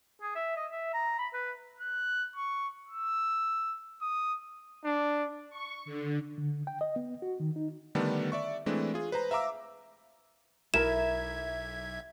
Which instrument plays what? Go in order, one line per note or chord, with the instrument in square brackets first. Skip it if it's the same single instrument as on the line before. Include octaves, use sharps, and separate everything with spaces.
[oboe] G#4
E5
D#5
E5
A#5
B5
B4
[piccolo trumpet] F#6
C#6
E6
D#6
[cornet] D4
[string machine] C#6
D3
[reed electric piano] D3
G5
D#5
B3
F#4
D#3
D#4
[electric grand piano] D3 D#3 G3 A3 B3 D4
D5 E5 C#6
E3 G#3 A3 C4 D4
F4 G#4
B4 C5 A#5
E5 F5 A#5 D6 E6
[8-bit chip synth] B1 E5 G#6 [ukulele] E4 A#4 [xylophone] E7